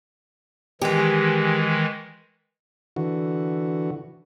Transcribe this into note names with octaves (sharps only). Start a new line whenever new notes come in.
D#3 E3 G#3 G4 G#4
D3 E3 F#4